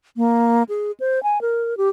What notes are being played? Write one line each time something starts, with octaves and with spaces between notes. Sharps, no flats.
A#3
G#4
C5
G#5
A#4
G4